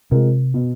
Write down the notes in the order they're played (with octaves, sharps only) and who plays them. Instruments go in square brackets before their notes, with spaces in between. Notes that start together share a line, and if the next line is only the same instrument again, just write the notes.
[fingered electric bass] C3 [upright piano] G#3 C4 F4 A#4
[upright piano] B2